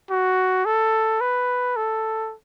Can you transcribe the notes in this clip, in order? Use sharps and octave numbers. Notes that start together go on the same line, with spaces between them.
F#4
A4
B4
A4